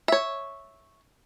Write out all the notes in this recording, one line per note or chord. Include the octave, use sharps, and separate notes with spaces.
C#5 E5